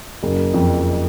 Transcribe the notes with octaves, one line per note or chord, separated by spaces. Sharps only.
F#1
F2